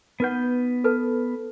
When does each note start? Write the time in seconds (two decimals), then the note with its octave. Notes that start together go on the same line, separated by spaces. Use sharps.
0.20 B3 D#4 B4 F#5 G6
0.84 A4 B4 A5